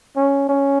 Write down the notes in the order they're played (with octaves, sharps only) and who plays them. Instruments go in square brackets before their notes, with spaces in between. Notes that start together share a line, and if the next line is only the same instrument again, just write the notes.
[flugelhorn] C#4
C#4